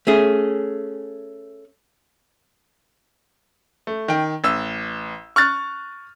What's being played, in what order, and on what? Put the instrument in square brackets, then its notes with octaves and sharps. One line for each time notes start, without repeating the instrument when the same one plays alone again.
[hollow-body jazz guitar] A3 C#4 G#4
[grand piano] A3
D#3 G5
A1 E6
C#6 F6 F#6 A6